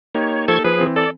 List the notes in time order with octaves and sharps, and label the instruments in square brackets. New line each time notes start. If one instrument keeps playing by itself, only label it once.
[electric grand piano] A#3 D#4 G4 [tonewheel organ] C#5
[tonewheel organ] F3 C#6 G#6 [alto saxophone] A4
[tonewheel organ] F3 G#4 [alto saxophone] B4
[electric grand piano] E3 C4
[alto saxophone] A4 [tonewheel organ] D5